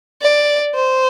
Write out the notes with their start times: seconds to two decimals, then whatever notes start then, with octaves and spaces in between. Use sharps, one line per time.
0.22 D5
0.74 C5